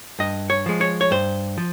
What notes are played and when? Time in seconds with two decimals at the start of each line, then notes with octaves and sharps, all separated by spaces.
0.19 G2 D#5
0.50 C#5
0.66 F3 G#3
0.81 C#5
1.01 C#5
1.11 G2 C5
1.58 F3